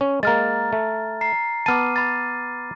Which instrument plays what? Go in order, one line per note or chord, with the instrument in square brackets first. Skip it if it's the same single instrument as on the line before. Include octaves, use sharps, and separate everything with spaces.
[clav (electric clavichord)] C#4
[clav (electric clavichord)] G#3 A#3 [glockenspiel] A#5 F6 A6
[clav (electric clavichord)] A3
[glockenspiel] A#5 C7
[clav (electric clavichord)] B3 A5 [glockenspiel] D6 F6 D#7
[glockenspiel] B5 A6